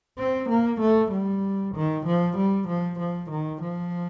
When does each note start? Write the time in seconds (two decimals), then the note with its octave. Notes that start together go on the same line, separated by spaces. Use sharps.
0.18 C4
0.49 A#3
0.81 A3
1.12 G3
1.75 D#3
2.06 F3
2.37 G3
2.68 F3
3.00 F3
3.31 D#3
3.62 F3